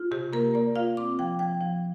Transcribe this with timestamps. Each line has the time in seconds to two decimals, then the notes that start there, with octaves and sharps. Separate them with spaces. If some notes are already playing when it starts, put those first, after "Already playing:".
Already playing: F4
0.11 C3 G4
0.33 A#3 A#4
0.54 A#3 D5
0.76 F4 F5
0.97 C4 D6
1.19 F3 G5
1.39 F3 G5
1.61 F3